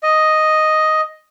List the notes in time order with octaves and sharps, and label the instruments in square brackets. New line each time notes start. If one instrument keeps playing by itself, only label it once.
[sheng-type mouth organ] D#5